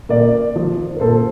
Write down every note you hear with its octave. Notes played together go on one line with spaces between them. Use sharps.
A#2 A#4 D5
F3
A#4
A#2 A4 C5